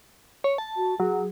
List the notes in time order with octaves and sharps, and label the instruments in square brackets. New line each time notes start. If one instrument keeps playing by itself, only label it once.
[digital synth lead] C#5
A5
[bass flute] F#4
[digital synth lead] F#3 [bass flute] G#4